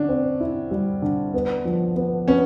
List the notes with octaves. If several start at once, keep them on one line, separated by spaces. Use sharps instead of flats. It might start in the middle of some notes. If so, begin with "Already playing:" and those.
Already playing: D3 C#4 D4
C4
E4
G3
D3
B3
F3
B3
B3 C#4